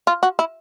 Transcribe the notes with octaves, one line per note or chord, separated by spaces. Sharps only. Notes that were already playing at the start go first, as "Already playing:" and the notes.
F4
F#4
E4